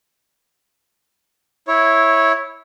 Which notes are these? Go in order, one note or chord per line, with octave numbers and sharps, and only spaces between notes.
E4 C#5